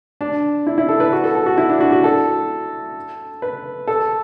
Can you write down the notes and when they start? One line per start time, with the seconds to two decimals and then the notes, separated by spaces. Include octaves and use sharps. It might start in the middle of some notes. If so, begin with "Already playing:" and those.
0.21 D4
0.67 E4
0.78 E4
0.89 A4
1.00 B4
1.13 F#4
1.24 A4
1.35 A4
1.46 F#4
1.58 E4
1.69 D4
1.81 F#4
1.92 F#4
2.04 A4
3.42 B4
3.87 A4